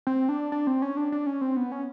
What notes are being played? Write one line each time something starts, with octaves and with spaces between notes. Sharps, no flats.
C4
D4
D4
C4
C#4
D4
D4
C#4
C4
B3
C#4